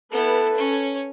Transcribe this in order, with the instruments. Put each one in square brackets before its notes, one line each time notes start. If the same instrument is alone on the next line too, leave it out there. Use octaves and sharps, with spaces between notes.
[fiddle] B3 E4 [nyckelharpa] A4 B4
[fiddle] C#4 C#5